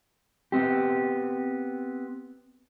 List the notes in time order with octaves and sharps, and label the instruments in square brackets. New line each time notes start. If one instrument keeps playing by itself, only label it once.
[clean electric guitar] B3 C4 G4